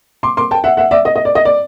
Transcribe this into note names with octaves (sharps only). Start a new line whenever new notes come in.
C6 D6
C6 D6
G5 A5
E5 F#5
E5 F#5
D5 E5
D#5
D#5
D5
D#5
D5